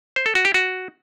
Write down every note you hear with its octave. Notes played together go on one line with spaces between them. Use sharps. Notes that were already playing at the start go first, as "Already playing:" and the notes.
C5
A4
F#4
G4
F#4